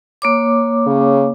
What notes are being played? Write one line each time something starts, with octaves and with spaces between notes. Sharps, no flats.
A#3 C#5 D6
C#3